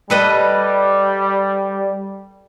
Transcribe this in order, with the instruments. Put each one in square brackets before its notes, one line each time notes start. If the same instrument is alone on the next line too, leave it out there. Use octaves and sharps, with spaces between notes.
[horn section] G3 [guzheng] A4 B4 D#5